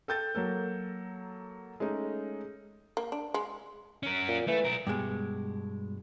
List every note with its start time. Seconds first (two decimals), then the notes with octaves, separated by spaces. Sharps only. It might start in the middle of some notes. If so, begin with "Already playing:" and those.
0.08 A4 G5 G6 A6
0.35 F#3 A#3 A4
1.80 G#3 A3 C#4 D#4
2.97 A#3
3.12 D4
3.34 G#3
4.03 C#4 A#4
4.28 A#2
4.48 E3 A3
4.65 B1 A#4
4.87 G2 B2 G#3